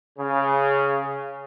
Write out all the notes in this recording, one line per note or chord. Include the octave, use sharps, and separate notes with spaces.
C#3